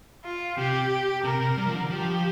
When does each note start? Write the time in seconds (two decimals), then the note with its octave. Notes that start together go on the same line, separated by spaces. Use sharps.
0.24 F4
0.58 C3 G4
1.24 C3 A#4
1.41 C3
1.58 G3
1.66 F3
1.75 D3
1.91 F3 G4